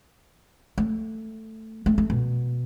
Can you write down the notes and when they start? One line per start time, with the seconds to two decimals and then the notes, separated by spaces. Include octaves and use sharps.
0.78 A3
1.86 A3
1.98 A3
2.10 B2